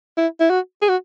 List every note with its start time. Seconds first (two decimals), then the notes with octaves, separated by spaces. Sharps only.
0.18 E4
0.40 E4
0.50 F#4
0.82 G#4
0.89 F#4